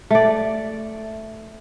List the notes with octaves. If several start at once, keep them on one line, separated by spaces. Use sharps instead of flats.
A3 D5